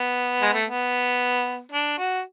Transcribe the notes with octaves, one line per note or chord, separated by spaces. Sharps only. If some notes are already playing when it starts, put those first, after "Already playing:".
Already playing: B3
G#3
A3
B3
D4
F#4